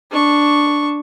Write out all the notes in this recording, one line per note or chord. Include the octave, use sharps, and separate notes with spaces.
D4 C#6